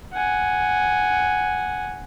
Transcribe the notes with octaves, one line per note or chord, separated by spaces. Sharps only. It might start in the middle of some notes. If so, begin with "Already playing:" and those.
F#5 G#5